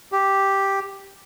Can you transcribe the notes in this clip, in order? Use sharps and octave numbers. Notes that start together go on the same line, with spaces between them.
G4